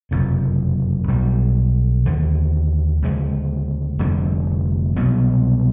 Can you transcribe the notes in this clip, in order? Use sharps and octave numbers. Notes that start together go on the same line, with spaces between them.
F#1 F2 C3
B1 B2 G3
D#2 D3 F3
D2 C#3 F3 G#3
F1 F2 D3 G3
C2 B2 F#3 B3